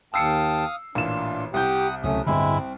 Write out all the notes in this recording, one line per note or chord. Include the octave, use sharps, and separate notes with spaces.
D#2 F5 G5 A5 D#6 E6 C7 C#7
A1 A#2 D4 F4 E7
C2 G4 F#5 G5 D#6 G6
C#2 C3 F#3 A3 C#4 D#6
D1 G2 D3 G#3 C4 E4